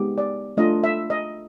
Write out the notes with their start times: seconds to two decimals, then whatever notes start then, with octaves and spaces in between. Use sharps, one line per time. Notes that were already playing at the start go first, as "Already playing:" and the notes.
Already playing: G#3 B3 D#4 G4
0.18 D5
0.57 A3 D4 F4 D#5
0.84 E5
1.10 D#5